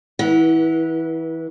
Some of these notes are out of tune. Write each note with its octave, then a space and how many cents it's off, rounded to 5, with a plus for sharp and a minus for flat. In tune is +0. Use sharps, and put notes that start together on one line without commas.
E3 -20 B4 -40 F#5 +0